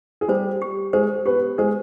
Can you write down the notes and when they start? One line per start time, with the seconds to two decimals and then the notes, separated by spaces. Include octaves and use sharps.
0.21 G#4
0.28 G3 G4 C5
0.62 G4
0.93 G#3 G#4 C5
1.26 B3 G4 B4
1.58 G#3 G#4 C5